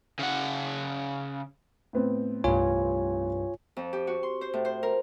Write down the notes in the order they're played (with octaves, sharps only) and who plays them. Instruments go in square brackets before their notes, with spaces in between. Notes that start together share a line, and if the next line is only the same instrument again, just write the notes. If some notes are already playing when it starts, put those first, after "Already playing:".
[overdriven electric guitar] C#3 F#5
[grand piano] A2 B3 C4
[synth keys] C2 G2 [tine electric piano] F4 C#5 G#5
[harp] F2
G4
F#4
C6
C5
A2
C5
A#4